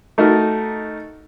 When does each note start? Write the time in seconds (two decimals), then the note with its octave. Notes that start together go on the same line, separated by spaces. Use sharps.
0.18 A3 D#4 F#4 A#4